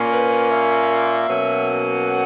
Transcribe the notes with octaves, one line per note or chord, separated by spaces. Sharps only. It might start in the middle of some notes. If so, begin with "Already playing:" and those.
Already playing: A#2 A#3 C#4
B4
E5
B2 F#3 A#3 C#4
F#5